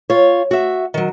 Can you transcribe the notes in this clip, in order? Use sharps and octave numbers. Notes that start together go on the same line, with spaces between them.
F4 C#5
F#4 E5
D#3 F#3